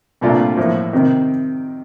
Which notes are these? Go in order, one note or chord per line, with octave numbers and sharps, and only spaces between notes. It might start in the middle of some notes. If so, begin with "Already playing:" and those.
C2 A#2 A3 D4 F4
A2 F3 A#3
C3 D#3